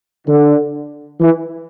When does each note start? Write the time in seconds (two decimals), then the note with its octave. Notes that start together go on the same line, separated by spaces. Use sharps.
0.26 D3
1.20 E3